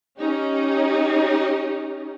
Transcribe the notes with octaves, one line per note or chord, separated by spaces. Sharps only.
C#4 D#4 G4